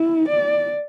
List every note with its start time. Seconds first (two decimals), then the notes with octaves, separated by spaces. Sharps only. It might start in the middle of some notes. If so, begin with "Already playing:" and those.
Already playing: E4
0.28 D5